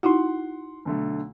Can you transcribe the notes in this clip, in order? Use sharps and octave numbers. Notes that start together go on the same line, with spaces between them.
D#4 E4 F#4 F#5 C6
B1 D3 A3